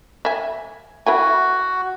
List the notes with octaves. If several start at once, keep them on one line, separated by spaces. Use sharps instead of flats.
E5 G#5
E4 F#4 B4 G#5